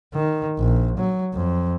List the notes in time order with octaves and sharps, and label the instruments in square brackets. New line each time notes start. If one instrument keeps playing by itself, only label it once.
[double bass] D#3
A#1
F#3
F2